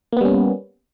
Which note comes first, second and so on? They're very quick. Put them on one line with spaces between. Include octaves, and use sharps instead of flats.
A#3 B3 G3 C#4